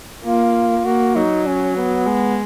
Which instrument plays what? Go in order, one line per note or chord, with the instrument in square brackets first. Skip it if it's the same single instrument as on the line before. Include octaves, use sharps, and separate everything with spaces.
[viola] A#3 [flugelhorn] F4
[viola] A#3 [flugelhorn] F#4
[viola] F#3 [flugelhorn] D#4
[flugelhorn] C#4
B3
[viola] G#3